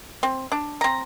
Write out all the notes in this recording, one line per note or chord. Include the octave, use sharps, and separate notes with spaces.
C4
D4
C4 A#5